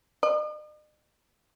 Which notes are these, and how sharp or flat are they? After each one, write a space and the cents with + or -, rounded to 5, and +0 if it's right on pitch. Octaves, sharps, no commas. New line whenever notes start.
D#5 -45